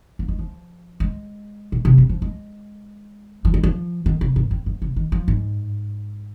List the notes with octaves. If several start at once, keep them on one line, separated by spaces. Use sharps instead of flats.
A#3
G#3
F3
G#3
A#2
C3
D#3
F3
G#3
F3
G#3
F3
D#3
C3
G#2
F2
G#2
C3
D#3
F3
G#2